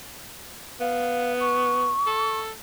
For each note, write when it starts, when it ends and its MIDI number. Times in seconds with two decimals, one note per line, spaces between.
0.80 1.93 59
0.80 1.33 77
1.40 2.39 85
2.06 2.51 69